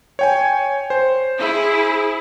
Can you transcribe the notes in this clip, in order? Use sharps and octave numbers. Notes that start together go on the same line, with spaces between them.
C#5 G5 G#5
C5
E4 G#4